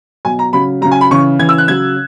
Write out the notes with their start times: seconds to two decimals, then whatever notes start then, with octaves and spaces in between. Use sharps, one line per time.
0.25 B2 F#3 G#5
0.39 A#5
0.53 C#3 F#3 B5
0.82 F#3 A#5
0.85 C#3
0.91 G#5
1.01 B5
1.11 C#3 E3 C#6
1.39 C#3 E3 G#6
1.49 E6
1.58 F#6
1.68 C#3 F#3 G#6